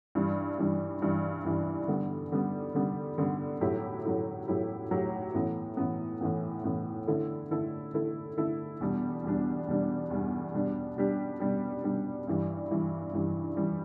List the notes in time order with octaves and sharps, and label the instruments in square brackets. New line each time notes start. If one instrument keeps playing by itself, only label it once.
[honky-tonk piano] G2 E3 G3 D4
G2 E3 G3 D4
G2 E3 G3 D4
G2 E3 G3 D4
D3 G3 B3
D3 G3 B3
D3 G3 B3
D3 G3 B3
A2 F#3 A3 E4 G4
A2 F#3 A3 E4 G4
A2 F#3 A3 E4 G4
A2 F#3 A3 E4 G4
A2 E3 B3
A2 E3 B3
A2 E3 B3
A2 E3 B3
D3 A3 E4 A4
D3 A3 E4 A4
D3 A3 E4 A4
D3 A3 E4 A4
E2 B2 G3 D4
E2 B2 G3 D4
E2 B2 G3 D4
E2 B2 G3 D4
B2 G3 D4 G4
B2 G3 D4 G4
B2 G3 D4 G4
B2 G3 D4 G4
G2 E3 G3
G2 E3 G3
G2 E3 G3
E3 G3